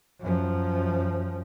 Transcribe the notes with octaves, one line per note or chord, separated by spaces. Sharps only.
F#2 F3